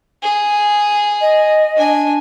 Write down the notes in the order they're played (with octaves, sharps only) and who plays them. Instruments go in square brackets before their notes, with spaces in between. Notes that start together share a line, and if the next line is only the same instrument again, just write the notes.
[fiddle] G#4
[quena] D#5
[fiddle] D4 G#5